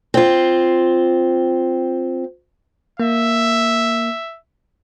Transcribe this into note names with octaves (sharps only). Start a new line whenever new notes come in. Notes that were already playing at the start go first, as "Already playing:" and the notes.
C4 F4
A#3 E5